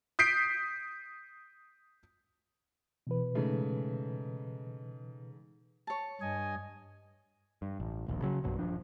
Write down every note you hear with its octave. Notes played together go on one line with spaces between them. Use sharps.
D#6 G6 B6 C7 D7
B2 E3 B4
G#2 C#3 A3
C#5 A5
G2 D#5 G#5
G2
A1
D1 A#1 D#2
C#3 F#3
B1 G2 B2 F#3
D#1 F3 D4